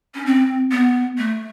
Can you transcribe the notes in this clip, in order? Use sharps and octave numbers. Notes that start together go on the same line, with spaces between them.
C#4
C4
B3
A3